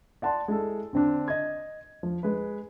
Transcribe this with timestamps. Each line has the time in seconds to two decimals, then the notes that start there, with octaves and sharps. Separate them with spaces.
0.22 D5 F#5 A5 C6
0.48 G#3 E4 A4
0.93 D3 C4 D4
1.28 D#5 G#6
2.03 F3
2.23 G#3 B4